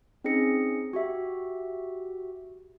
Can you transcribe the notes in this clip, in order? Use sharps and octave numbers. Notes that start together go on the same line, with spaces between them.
C4 C#4 D#4 G#4 A#6 C#7
F#4 G4 E5